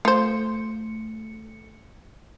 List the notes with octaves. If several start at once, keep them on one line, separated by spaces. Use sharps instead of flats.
A3 F4 C5 C#7